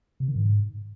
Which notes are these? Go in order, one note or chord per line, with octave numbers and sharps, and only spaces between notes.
C3
D#3
G#2